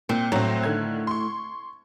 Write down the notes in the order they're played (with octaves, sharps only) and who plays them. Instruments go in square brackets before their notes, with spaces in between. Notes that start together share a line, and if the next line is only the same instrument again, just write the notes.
[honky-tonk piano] A#2 [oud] C4
[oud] A2 [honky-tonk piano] F#3 C4
[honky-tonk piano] D3 D#3 G#6
C6 C#6